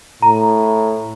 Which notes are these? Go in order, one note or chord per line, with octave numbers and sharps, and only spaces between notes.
A2 A#5